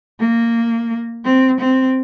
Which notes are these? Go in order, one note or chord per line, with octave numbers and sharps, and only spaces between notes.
A#3
C4
C4